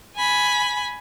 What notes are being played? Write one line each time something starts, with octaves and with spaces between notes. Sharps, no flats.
G#5 B5